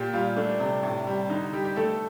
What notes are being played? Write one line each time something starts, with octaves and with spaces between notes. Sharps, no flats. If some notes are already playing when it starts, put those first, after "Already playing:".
Already playing: A#2 G4
G3 F4
A3 D4
C3
A2
G3
D3 D#4
G3 G4
G4
A3 A4